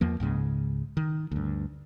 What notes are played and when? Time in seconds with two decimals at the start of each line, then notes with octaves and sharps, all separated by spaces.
0.01 E2 F3 A#3
0.20 C#2 G#2 C#3 G#3
0.97 D#3
1.31 D2 G2